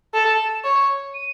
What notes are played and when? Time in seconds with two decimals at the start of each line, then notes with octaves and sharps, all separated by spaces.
0.14 A4 E7
0.64 C#5
1.14 D#7